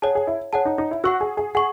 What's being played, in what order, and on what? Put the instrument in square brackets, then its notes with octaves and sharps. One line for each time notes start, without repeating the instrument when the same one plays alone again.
[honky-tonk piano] G#4 [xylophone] C#5 F#5 A5
[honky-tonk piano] G#4
E4
[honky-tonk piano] G#4 [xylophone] C#5 F#5 A5
[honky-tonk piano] D#4
D#4
E4
[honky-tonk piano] F#4 [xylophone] F#5 C#6 E6
[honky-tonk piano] G#4
G#4
[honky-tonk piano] G#4 [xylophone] F#5 C#6